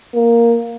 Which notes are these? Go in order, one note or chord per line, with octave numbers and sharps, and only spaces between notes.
A#3